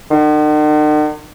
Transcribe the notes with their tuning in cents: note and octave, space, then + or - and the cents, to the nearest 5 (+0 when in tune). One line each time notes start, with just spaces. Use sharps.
D#3 -45